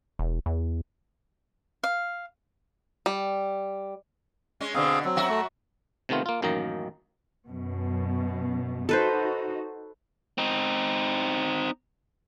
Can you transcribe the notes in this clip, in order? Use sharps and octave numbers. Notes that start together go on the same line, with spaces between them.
E1
E2
F5
G3
G#3 C#4
B2 D3 C4 G#4 F5
F#3 C4
F#2 F#4 E5
A3
C3 D#3 A3 B3 F4
A#3 F4
A1 F#2 D#3 A#3 D#4 A#5
F#2 B2
D#4 F#4 A4 B4 C5
C4 D#4